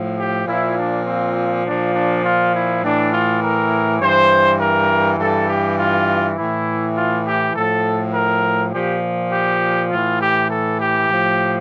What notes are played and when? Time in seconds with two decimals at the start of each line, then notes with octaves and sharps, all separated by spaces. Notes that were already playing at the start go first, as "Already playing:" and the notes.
Already playing: A2 F3
0.18 G4
0.47 A#2 F3 E4
0.77 D4
1.06 C4
1.65 A#2 F3 D4
1.95 D4
2.24 F4
2.54 E4
2.83 A2 E3 D4
3.13 F4
3.43 A#4
4.01 G2 E3 C5
4.61 A#4
5.19 G2 E3 A4
5.49 G4
5.78 F4
6.38 A2 E3 E4
6.96 F4
7.26 G4
7.55 A2 F3 A4
8.14 A#4
8.73 A#2 F3 G4
9.32 G4
9.91 A2 E3 F4
10.21 G4
10.50 A4
10.80 G4
11.09 A2 F3